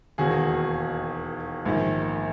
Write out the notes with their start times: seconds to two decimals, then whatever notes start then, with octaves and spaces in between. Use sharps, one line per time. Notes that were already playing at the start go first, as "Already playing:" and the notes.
0.18 E1 D#2 D#3 F#4 G#4
1.65 A#1 G#2 D#3